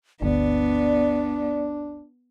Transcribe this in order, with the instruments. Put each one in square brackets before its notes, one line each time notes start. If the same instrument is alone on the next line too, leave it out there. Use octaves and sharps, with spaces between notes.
[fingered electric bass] G1 D2 [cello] B3 [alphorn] D4 [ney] D5